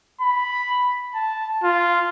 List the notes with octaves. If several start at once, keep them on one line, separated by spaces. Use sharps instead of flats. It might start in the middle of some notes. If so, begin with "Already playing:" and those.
B5
A5
F4